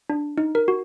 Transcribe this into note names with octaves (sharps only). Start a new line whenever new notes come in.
D4
D#4
A#4
F#4